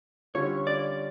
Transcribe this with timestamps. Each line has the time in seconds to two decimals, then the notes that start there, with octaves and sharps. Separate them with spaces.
0.34 D3 G3 C#4 F4 C#5
0.67 D5